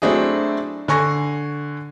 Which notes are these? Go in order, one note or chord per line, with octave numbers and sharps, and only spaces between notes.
F#3 A3 C4 D4 E4 G#4
D3 G#5 C#6 A#6